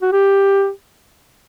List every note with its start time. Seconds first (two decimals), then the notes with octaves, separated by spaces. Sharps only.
0.02 F#4
0.12 G4